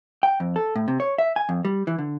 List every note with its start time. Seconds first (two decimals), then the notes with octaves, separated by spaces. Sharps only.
0.23 G5
0.40 F2
0.56 A4
0.76 A2
0.88 C3
1.00 C#5
1.18 E5
1.36 G#5
1.49 F2
1.65 G3
1.87 E3
1.99 D3